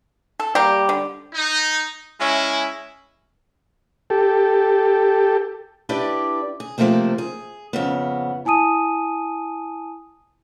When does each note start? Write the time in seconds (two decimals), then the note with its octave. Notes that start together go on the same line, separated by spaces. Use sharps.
0.40 A4
0.55 G3 A#3 G4
0.89 D3
1.33 D#4
2.20 G#3 C#4 E4
4.10 G4 A4
5.89 D4 E4 G4 B4 D5 G5
6.60 G#4
6.78 C3 F3 G3 A3 A#3 C4
7.18 G#4
7.73 F2 C#3 B3
8.45 E4 G#5 A5 D#6 D#7